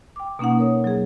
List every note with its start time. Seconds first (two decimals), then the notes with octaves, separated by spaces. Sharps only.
0.16 G5 D6
0.39 B2 A#3 C#4 D#4 F#5
0.59 A#4 C#5 D#6
0.84 F#3 G#4